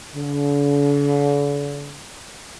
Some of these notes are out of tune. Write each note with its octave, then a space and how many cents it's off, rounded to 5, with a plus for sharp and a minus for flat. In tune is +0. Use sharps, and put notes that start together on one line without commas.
D3 -45